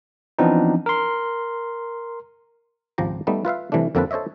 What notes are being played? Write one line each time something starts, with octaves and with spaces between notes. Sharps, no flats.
E3 F3 B3 C4 D4 D#4
A#4 C6
G#1 C#2 F3 G4 A#5
G3 A3 B3 D#4
F4 B4 E5 F5
C3 E3 G3 A3 D4
F2 D3 A#3 C4 A4 B4
A4 C5 C#5 D#5 E5